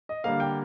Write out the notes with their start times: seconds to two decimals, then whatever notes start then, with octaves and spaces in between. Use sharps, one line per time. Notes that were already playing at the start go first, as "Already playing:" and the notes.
0.09 D#5
0.24 D3 G3 A#3 F5
0.40 G5